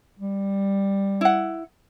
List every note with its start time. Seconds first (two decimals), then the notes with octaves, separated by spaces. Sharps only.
0.19 G3
1.21 E4 F#5